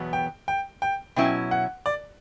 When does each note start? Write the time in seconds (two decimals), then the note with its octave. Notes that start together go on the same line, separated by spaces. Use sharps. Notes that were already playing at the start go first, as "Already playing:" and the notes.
Already playing: E2 B2 F#3 B3
0.13 G5
0.48 G5
0.82 G5
1.16 B2 F#3 C#4 E4 G5
1.51 F#5
1.86 D5